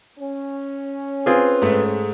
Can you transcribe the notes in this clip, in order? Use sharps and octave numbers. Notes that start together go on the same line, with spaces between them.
C#4
C4 F4 G#4 B4
G#2 G#3 A3